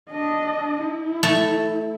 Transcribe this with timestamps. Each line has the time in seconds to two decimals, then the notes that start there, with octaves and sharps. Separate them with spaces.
0.10 D4 D#5
0.82 E4
1.23 A3